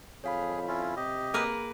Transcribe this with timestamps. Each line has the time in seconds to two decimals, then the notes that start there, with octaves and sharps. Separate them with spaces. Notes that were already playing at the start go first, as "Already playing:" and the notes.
0.24 F2 G#4 C#5 F5 B5
0.67 C#4 E4 F4
0.97 C3 G4 D#5
1.34 A#3 G#4 A#4 B4